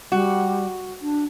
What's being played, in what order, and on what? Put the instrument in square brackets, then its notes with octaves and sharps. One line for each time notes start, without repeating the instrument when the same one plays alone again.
[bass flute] G3 [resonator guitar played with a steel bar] F#4
[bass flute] D4